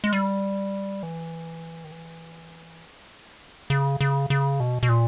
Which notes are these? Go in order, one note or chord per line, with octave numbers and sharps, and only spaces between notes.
G#3
G3
E3
D#3
E3
C#3
C#3
C#3
B2
B2
A#2